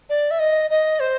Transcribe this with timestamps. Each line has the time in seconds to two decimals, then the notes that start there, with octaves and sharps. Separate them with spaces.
0.10 D5
0.31 E5
0.39 D#5
0.71 D#5
1.00 C5